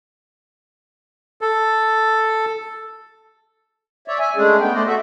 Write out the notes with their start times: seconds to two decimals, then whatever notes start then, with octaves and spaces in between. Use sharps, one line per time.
1.41 A4
4.08 C#5 D5 E5
4.19 E5 G#5
4.36 G#3 A3 C#4 D4 G#4
4.60 A3 B3 G5
4.75 A3 C5 D5 D#5
4.87 F#4 A4 E5